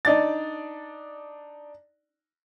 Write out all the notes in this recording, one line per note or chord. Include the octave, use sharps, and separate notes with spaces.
D4 D#4 D5 A6